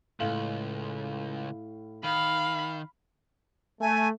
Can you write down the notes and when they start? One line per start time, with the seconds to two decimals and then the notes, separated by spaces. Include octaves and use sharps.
0.20 C#2 A2 F5 F#7
2.04 D#3 F5 B5
3.81 A3 G#5